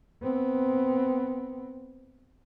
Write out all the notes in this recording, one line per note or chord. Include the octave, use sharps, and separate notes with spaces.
B3 C4